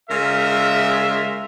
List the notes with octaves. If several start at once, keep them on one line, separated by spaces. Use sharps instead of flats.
C#3 G#3 F4 A#4 E5